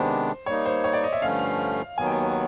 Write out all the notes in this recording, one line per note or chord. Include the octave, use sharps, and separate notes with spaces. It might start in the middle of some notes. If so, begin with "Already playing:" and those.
Already playing: C3 D#3 G#3 B3 D4 C5
G3 A#3 D#4 C#5
C5
C#5
D5
D#5
E5
G2 D3 F3 A3 C#4 F5
D#2 D#3 F#3 B3 G#5
G5